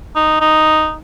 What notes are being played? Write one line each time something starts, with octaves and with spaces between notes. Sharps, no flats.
D#4
D#4